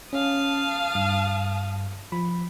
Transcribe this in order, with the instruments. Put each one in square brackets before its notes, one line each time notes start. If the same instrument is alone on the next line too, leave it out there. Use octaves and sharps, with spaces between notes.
[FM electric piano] C#4 [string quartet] F5 A5 D#6
[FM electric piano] G2
F3 B5